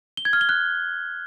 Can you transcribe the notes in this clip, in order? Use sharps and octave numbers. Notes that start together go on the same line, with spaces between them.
G7
G#6
F6
G7
F#6